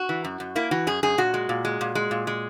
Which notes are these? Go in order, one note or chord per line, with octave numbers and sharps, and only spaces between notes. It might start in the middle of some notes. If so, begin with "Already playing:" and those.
Already playing: F#4
E3
F#2
F#2
A#3 E4
E3 F#4
F#2 G#4
F#2 G#4
A#2 F#4
G#3
A#2
G#3
A#2
G#3
A#2
G#3